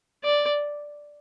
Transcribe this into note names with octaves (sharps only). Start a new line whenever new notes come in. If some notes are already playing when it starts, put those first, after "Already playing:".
D5